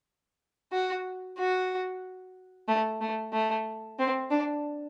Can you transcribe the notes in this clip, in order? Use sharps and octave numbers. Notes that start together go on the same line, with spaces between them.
F#4
F#4
A3
A3
A3
C4
D4